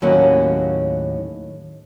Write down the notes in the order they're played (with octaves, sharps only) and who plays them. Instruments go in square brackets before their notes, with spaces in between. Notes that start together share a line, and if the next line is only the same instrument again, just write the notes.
[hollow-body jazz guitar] D#2 A2 F#3 A#3 C#4